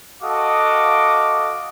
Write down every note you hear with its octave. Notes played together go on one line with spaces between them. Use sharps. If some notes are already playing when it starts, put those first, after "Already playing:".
F#4 A4 D#5 F5 D6 D#6